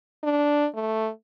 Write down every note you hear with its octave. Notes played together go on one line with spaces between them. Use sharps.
D4
A3